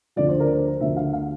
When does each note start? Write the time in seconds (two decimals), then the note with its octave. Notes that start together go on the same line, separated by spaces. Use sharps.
0.16 D2 D3 F3 D5
0.29 C5
0.40 A#4
0.52 C5
0.81 D2 D3 F3 E5
0.97 F5
1.13 F5